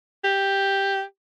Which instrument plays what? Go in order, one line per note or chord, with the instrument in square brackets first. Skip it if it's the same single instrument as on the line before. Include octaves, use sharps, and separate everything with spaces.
[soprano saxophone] G4